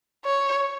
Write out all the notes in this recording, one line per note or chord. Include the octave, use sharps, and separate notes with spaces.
C#5